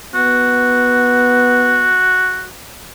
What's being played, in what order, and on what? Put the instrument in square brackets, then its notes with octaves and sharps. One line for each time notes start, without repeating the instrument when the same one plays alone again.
[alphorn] B3 [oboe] F#4